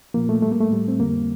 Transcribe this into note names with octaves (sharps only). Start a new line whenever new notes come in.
A#2 F3 A#3
A3
A2 G3 A3
A#3
A3
A2 G3
C4
F2 D3 G3 A#3